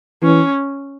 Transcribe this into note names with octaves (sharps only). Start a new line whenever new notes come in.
E3 C#4